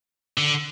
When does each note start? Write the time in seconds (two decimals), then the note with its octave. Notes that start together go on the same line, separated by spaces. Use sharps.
0.38 D3